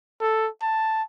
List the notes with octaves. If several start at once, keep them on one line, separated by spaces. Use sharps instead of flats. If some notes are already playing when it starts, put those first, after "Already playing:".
A4
A5